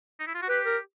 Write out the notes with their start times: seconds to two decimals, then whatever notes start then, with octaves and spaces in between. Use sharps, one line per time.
0.20 D#4
0.27 E4
0.35 F4
0.42 F#4
0.49 G4 B4
0.65 A#4